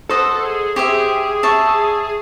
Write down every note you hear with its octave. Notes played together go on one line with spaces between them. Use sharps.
A4 C5 D#5 F#5
G#4
G4 G#4 C5 E5
C#5 E5 A5